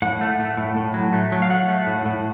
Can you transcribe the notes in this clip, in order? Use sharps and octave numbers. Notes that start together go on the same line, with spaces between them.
A2 F#5
A3
A3
A2
A2
F#3
A3
F#3
F5
F#3 F#5
A3
A2
A2